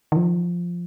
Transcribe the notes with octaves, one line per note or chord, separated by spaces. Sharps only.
D#3
F3